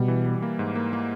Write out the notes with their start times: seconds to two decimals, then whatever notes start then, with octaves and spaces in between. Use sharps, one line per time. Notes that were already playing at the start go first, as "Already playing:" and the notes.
Already playing: B2 G3
0.08 E3
0.26 G3
0.42 A#3
0.59 G#2
0.75 A#3
0.93 A#3